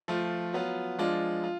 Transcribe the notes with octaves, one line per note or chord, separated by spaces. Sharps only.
F3 A3 F4
F#3 B3 F4
F3 G#3 D4 F4
F4